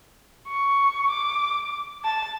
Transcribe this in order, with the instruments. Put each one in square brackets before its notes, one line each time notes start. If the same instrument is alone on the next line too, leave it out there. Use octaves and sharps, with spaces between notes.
[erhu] C#6
D6
A5